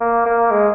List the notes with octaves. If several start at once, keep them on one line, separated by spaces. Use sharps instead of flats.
A#3
A#3
G#3